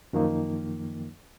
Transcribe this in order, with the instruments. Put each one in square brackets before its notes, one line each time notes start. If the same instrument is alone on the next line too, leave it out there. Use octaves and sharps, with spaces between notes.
[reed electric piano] F#2 D#3 F3 A#3 D#4